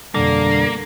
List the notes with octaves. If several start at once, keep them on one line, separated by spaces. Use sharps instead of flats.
F2 B2 D3 G3 A#3